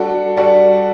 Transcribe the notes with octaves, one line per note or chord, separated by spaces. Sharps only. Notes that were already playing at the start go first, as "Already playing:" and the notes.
Already playing: G3 D4 F#4 A4
G3 D4 F#4 A4